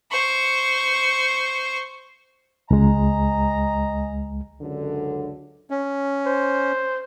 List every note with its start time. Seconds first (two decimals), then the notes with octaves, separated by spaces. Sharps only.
0.11 C5 C#6
2.71 C#2 G#3 D#5 G#5 A#5
4.62 C#2 F#2 D3
5.70 C#4
6.26 C5